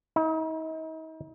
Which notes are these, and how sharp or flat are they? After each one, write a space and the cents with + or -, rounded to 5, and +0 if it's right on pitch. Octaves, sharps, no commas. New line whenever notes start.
D#4 +40